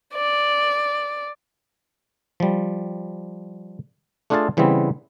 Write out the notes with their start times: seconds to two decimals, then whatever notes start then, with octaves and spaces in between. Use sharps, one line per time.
0.14 D5
2.40 F3 G3
4.30 A3 D4 F4 G#4 F5 A5
4.57 C#3 E3 G3 B3 C4